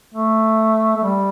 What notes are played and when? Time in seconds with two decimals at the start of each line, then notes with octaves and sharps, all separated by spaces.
0.14 A3
0.97 A3
1.03 G3